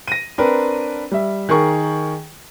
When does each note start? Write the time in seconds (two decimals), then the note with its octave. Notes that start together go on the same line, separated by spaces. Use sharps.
0.08 A#6 D#7
0.38 C4 D4 A#4 B4
1.12 G3 E5
1.49 D#3 G#4 A#4 C#6